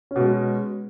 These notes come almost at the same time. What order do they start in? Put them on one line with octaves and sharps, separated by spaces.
C#4 B2 G#3